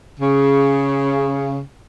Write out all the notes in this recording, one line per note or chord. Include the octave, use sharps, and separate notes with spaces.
C#3